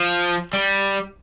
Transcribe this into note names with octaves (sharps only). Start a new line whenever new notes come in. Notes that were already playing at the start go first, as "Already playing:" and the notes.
Already playing: F3
G3